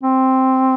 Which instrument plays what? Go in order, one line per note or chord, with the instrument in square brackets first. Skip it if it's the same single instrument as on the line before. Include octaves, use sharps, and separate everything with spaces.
[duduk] C4